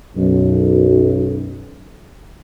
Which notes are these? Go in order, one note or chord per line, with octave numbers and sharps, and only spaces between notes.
B1 F#2